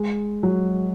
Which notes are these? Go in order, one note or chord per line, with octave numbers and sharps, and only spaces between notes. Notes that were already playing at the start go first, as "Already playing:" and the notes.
Already playing: G#3
F#3